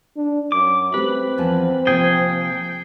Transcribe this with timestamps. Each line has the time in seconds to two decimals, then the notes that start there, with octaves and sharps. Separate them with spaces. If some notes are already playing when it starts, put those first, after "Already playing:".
0.17 D4
0.52 F#2 D6
0.94 A3 C4 G4 B4
1.38 E2 F3 A5
1.87 C3 F3 A#3 G#4 G5